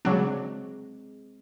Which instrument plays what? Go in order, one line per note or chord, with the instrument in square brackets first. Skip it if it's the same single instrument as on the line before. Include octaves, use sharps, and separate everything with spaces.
[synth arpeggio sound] C#3 F#3 D4 [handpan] G#3 C4